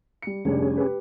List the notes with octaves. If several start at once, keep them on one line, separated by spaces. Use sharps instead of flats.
G3 C#7
F1 G3 C#4 D4 G#4
G4 B4